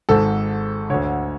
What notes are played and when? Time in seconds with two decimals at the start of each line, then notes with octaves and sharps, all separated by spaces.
0.09 G#1 G#2 A4
0.90 D2 D3 C#5